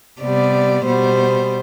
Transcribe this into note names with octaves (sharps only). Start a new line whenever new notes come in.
C3 G3 B3 D5
B2 G3 B3 C5